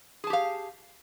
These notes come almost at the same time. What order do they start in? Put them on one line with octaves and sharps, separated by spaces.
G#4 A5 G4 F5